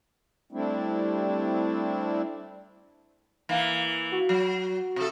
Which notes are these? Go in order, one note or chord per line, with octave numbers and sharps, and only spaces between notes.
G3 A3 C4 D4 E4
E3 A#3
F#4
F#3
C3 A4